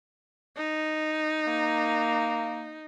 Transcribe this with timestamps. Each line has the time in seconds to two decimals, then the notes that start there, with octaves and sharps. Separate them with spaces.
0.57 D#4
1.47 A#3